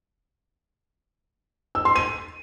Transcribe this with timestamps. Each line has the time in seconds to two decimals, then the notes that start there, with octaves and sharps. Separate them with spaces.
1.75 E6
1.85 C6
1.96 D#7